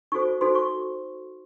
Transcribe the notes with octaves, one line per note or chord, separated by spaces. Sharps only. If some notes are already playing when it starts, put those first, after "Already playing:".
D#4 F#4 A4 C5 C#6
D#4 F#4 A4 C5 C6
C#6